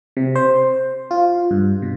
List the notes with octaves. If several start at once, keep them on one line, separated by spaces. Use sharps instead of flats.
C3
C5
F4
G2
B2